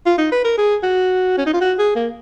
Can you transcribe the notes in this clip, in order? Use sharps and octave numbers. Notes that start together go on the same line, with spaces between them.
F4
D#4
B4
A#4
G#4
F#4
C#4
D#4
F4
F#4
G#4
A#3